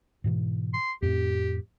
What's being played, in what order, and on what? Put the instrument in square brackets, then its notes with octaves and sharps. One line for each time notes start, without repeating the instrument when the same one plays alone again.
[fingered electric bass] G#2 B2 E3
[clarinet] C6
[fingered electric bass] F2 A2 [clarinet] G4